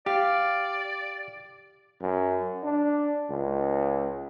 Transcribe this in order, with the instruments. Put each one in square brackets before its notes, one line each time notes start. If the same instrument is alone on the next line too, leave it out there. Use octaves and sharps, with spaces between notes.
[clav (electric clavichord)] G4 [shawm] D5 [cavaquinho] F5
[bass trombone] F#2
D4
C#2